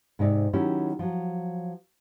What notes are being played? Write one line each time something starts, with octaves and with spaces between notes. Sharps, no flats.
G#2 C3 D#4 D5 E5
D#3 F#3 C#4 E4 G4
F3 F#3